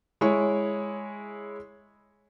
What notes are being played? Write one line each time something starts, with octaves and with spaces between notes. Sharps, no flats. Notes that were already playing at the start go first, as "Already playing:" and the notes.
G#3 E4 C#5